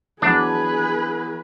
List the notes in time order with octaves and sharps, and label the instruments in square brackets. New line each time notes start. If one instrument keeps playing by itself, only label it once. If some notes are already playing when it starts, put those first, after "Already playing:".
[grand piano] E3 F#3 B3 [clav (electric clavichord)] D4 [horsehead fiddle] G#4 [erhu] B4